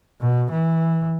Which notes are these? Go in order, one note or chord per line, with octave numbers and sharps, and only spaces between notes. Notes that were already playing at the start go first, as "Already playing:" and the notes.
B2
E3